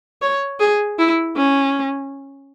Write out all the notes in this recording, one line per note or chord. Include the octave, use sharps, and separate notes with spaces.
C#5
G#4
E4
C#4